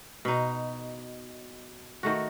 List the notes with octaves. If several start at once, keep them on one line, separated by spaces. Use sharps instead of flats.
B2 D#4
D#3 A3 F#4